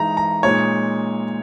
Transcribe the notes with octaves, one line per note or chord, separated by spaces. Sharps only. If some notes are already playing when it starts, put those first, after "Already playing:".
Already playing: E3 G#3 D#4 A#5
A#5
A#2 G#3 D#4 C#5